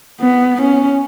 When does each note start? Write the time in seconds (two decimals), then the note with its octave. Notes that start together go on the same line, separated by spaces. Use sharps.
0.21 B3
0.62 C#4